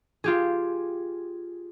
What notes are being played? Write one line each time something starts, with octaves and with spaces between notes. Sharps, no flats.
F4 G4 G#4